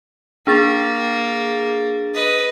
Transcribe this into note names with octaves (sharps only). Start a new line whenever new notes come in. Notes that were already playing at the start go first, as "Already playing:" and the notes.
A#3 D4 G#4 A6
B4 D#5